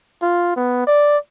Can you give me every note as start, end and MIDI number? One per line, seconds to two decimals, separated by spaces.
0.22 0.55 65
0.56 0.86 59
0.87 1.17 74